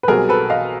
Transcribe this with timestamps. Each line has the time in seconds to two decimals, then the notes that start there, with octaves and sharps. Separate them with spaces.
0.03 B4
0.08 B1 B2 G3 C4 G#4 A#4
0.29 A4 B4
0.50 D#5 F5